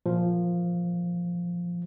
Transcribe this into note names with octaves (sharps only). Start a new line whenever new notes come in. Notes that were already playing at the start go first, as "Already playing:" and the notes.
A#2 F3